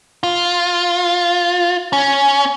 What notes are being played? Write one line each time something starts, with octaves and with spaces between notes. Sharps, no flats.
F4
C#4